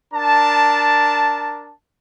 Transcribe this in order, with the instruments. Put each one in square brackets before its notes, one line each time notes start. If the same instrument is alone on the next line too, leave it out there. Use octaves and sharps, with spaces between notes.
[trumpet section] D4 A#4 A5